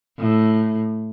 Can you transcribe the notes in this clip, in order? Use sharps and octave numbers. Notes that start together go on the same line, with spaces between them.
A2